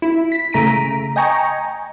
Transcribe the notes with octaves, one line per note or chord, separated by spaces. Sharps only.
E4
B6
C#3 A3 A#5 B6 D7 D#7
D#5 G5 G#5 A#5 C#6